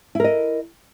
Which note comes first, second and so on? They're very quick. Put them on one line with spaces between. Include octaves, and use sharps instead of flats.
E4 A#4 D#5